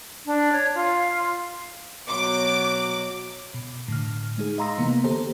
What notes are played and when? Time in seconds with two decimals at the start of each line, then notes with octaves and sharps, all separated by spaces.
0.26 D4
0.52 C#5
0.75 F4
2.09 B2 F#3 D6
3.54 B2
3.88 A2 D3 F6
4.38 G#3 D#4 G#4
4.58 D#5 F5 A#5 C6 E6 A#6
4.78 C3 E3 A#3 B3
5.04 D3 G4 A4 C5 A#5